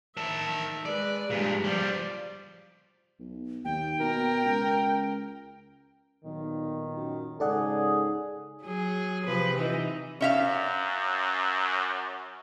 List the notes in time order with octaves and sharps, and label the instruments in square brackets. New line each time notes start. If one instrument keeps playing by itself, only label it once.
[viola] D#3 E5 [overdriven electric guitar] A#4 A5
[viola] G#3 B4 [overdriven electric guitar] D5
[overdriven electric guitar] G2 A#2 [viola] G3 G#3
[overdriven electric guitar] F3 G3 [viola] D5
[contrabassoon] B1
[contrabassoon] D#2 [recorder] G5
[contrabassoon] B2 [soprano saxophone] A#4
[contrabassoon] C#2
[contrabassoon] B1 [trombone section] A#2 D#3
[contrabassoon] F#2
[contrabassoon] G#2 [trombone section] C#3 G#4 [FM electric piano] A4 D5 F#5
[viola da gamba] F#3 G#4
C3 F3 B4
E3 D#4
[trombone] F#2 [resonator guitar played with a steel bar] C#4 E5 F5